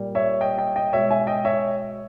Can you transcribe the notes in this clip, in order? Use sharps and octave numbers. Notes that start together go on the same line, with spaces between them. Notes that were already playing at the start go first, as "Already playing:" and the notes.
Already playing: A#2 G3
C#5 E5
D#5 G5
D#5 G5
D#5 G5
B2 G#3 C#5 E5
E5 G#5
D#5 G5
C#5 E5